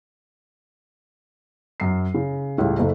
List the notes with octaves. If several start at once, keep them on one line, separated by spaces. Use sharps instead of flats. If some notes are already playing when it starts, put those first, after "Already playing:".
F#2 C7
C#3
C#2 A2 C#3 G3
F#1 A3